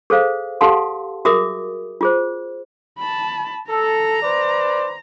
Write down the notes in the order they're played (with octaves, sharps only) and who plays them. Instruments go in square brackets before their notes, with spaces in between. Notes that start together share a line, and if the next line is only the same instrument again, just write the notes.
[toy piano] G#4 A4 C5 F5
G4 A4 F5 F#5 A5 C6
F#4 G#4 A#4 E5 D6 D#6
F4 G#4 C5
[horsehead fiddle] A5 B5
[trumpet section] A4 [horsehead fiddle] A#5
[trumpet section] B4 C5 D5